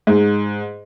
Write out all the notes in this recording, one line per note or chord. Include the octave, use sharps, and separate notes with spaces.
G#2